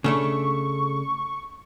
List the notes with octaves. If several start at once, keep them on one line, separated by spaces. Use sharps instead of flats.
C#3 A3 D4 C#6